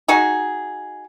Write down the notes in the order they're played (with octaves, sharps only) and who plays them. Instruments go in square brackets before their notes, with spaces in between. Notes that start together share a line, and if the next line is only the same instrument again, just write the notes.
[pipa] D#4 F#4 G#4